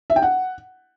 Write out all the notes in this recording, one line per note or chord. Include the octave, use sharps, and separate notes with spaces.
E5
G5
F#5